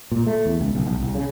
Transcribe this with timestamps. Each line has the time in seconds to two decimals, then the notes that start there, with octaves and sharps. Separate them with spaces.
0.12 A#2
0.27 A3
0.46 E2
0.61 C#2
0.75 B1
0.86 B1
1.00 C2
1.15 C#3